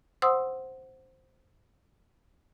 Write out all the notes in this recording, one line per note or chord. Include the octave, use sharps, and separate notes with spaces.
C5 F#5 C6 D#6 E6